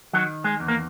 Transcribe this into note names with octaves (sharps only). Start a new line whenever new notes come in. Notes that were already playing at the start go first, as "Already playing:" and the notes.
D#3 F#3
G#3
E2
A#3